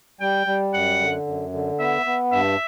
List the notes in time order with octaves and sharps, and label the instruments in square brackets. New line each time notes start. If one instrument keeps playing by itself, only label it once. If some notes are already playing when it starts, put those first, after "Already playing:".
[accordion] G3 [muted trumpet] G5
[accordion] G3
[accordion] F#2 [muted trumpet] F#5
[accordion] D3
F#2
D3
[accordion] B3 [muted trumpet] E5
[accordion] B3
[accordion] G2 [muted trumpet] E5